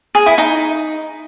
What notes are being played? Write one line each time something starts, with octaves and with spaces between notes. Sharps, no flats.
G#4
E4
D#4